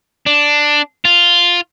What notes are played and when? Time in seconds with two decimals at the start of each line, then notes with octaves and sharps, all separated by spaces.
0.26 D4
1.05 F4